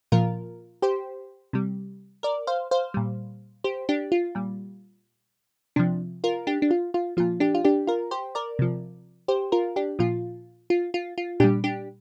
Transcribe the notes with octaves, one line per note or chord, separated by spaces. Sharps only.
A#2 F3 F4 A#4
G4 C5
C3 G3
A#4 D5
C5 F5
C5 F5
A#2 G3
G4 C5
D4 G4
F4
A#2 G3
C3 F3 D4
F4 A#4
D4 G4
D4
F4
F4
A#2 F3 F4
D4 G4
F4
D4 G4
F4 A#4
G4 C5
A#4 D5
C3 F3
G4 C5
F4 A#4
D4 G4
A#2 F3 F4
F4
F4
F4
A#2 G3 D4 G4
D4 G4